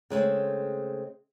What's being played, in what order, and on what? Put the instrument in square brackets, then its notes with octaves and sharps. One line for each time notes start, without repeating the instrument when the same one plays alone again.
[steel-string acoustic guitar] C#3 G#3 A3 C4